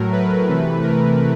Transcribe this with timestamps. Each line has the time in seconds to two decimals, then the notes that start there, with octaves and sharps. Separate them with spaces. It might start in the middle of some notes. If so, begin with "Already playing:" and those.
Already playing: A2 F#3 A3 A#4
0.12 B4
0.48 C3 E3 A3
0.83 A#4